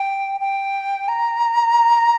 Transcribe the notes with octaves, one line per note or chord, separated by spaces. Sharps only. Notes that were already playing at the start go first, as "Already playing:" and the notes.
Already playing: G5
G5
A#5